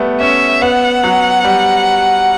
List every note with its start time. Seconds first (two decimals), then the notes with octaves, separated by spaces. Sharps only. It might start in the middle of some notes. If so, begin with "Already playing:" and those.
Already playing: G3 A3 B3
0.21 C#4 E5
0.62 B3 F#5
1.04 F#3
1.45 G3